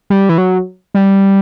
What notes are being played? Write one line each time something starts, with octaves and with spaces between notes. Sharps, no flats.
G3
E3
F#3
G3